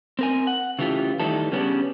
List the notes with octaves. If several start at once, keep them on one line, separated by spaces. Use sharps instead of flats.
C4 A#4 G#5
F#5
C#3 E3 A3 F4 G4
D#3 E3 G3 A3 A4
C#3 G3 B3 C#4 D4